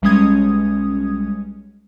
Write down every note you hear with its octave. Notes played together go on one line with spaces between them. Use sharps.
B1 G3 G#3 C#4 D#6 G#6